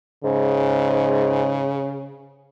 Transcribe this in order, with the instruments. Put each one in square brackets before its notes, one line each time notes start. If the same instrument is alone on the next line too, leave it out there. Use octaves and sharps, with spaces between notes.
[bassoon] G#2 [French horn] C#3